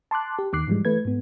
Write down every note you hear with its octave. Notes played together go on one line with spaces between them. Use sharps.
A5 C6 D6 F#6
G4
D#2 D#3 D6 F#6 C7
G#2 E3 F3 G3 G#3
E3 A3 B4 G#6
G#2 B3